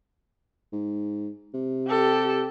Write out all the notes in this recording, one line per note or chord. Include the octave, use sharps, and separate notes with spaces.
G#2
C3
G4 A4